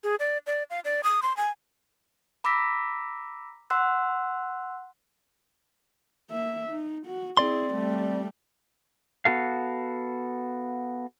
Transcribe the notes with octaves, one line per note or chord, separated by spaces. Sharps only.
G#4
D5
D5
F5
D5
D#6
C6
G#5
A#5 B5 D6 E6 A#6 B6
F#5 C6 E6 F#6
A#3 E5
D#4
F#4
C4 E4 G#4 D5 C6
G3 A3
B3 F#4 A4 F5